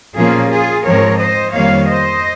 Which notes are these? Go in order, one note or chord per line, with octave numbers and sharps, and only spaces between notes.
A#2 F3 A#3 C#4 F4 G#4
F4 G#4
G#2 F3 C4 A#4 C#5
C5 D#5
F2 D#3 G3 A#3 C#5 F5
C5 D#5